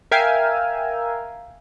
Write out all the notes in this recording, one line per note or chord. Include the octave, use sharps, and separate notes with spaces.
A#4 E5 F5 G5 G#5